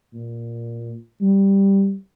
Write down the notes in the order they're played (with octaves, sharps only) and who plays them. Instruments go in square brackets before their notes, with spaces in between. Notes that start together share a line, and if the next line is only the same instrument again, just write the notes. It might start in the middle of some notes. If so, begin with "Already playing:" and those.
[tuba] A#2
G3